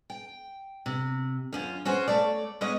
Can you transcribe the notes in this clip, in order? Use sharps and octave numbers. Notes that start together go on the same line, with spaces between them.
G5
C3
F#2 C#4 F4
C#4 F#4 G#4 C5
A3 C#5 D5
G#3 B3 C#4 C#5 D#5